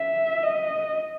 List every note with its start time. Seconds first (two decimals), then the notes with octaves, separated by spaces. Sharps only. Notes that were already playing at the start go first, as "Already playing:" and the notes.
Already playing: E5
0.43 D#5